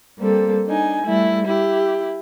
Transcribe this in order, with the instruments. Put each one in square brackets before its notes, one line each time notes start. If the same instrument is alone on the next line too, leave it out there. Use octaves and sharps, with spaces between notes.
[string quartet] G3 A#3 C4 A4
D4 D#4 G#5
G3 A3 E4
E4 G4